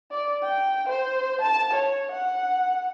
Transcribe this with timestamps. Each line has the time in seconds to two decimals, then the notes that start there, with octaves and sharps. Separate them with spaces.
0.11 D5
0.43 G5
0.89 C5
1.41 A5
1.73 C#5
2.12 F#5